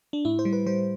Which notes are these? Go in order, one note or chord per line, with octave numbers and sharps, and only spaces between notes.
D4
A2 E4
C5
G3
B4
G3 C5